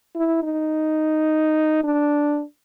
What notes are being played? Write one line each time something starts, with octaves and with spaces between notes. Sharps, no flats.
E4
D#4
D4